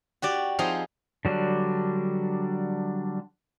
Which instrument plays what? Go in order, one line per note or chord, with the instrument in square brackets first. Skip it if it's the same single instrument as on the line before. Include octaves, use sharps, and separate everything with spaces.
[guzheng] F#4 G4 D5
F3 C4 D#4 F4 G#4 C5
[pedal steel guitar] D3 F#3 G3 D4